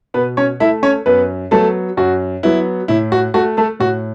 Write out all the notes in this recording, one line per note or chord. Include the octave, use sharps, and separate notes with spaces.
B2 B3 B4
C#4 C#5
A3 E4 E5
C#4 C#5
F#2 B3 B4
F#3 A3 B3 A4
F#2 F#4
F#3 B3 E4
A2 E4
F#4
A3 F#4
A3 A4
A2 F#4